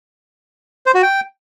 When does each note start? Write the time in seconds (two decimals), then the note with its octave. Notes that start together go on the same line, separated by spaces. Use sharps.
0.86 C5
0.95 F#4
1.03 G5